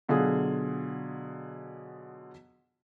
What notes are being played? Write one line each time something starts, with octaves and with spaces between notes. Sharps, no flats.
B2 D3 F#3 F4 G#4